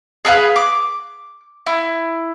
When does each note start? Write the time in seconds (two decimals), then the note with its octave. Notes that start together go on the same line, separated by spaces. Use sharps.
0.25 G#4 A4 B4 F5
0.56 D6
1.66 E4